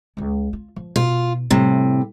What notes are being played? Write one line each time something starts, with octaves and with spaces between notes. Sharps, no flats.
C#2 G#3
F4
F3
B2 F4
A2 C3 G3 E4